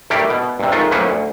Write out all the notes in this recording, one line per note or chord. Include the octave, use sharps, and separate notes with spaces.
A3 D4 E4 G4 A#4
B2
G2 C3
D#3 G#3 A3 F4
A2 F#3 A#3 C#4 B4 C5
D2